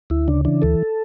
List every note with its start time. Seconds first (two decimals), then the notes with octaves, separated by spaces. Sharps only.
0.10 D2 E4
0.28 C#3 D4
0.45 E3 D4
0.62 D2 A4